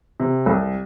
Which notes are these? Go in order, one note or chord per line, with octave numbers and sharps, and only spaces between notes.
C3
C2